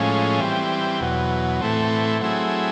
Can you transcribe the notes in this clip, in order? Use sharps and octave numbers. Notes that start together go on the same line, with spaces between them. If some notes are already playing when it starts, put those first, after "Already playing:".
Already playing: A2 F3 G#3 C#4
E3 G3 C4
E2 B2 F#3
A2 E3 A3 C4
F#3 A3 C4 E4 G#4